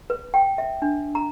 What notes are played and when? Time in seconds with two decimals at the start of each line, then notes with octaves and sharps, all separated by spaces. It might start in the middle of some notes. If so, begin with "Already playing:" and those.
0.10 B4
0.34 G5
0.58 E5
0.82 D4
1.15 A#5